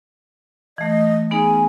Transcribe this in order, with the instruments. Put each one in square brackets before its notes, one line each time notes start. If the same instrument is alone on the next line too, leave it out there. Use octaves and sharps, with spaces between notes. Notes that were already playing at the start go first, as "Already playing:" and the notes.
[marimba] E3 A3 [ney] D#5
[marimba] B3 D#4 G#4 [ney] G#5